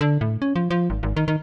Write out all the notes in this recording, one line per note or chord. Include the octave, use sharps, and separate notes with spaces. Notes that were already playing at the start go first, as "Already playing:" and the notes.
D3
A2
C#4
F3
F3
G#1
G#1
D#3
D#3